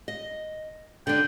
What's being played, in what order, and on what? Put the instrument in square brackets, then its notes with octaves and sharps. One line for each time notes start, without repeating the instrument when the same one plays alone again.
[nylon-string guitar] D#5
[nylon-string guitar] D3 D4 [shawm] G5